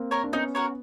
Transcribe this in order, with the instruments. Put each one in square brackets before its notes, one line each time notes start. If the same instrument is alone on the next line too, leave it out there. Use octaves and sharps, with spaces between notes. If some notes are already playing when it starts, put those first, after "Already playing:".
Already playing: [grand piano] A#3 C4
[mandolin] A#4 C#5
[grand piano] D4
[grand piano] B3 C#4 [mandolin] D#4
[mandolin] F#4 A#4 C#5